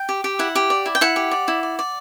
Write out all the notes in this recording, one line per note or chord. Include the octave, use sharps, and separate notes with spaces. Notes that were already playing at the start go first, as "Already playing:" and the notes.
Already playing: G5
G4
G4
E4 F#5
G4
D5
E4
G5
E4 F#5
G4
D5
E4
D5
D5